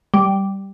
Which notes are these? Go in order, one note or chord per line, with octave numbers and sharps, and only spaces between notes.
G3